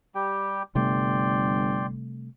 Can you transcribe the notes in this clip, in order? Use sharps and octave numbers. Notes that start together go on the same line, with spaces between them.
G3 G4 G5
G1 C3 G3 A3 D5 G5 C6